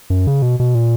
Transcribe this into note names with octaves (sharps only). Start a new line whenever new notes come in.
F#2
C#3
B2
B2
A#2